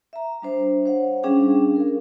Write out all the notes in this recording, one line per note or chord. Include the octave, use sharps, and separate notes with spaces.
E5 A#5
G3 D4 C5
C5 C#5 F5 F#5
G3 C#4 D4 G#4 F5 G5
A#4 F5